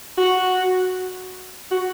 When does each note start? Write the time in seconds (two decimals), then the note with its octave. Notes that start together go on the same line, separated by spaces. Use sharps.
0.18 F#4
1.71 F#4